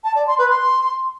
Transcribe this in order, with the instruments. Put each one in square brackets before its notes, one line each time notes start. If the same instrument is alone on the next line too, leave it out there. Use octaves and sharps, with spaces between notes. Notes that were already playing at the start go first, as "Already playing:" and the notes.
[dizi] A5
D5
C6
B4
C6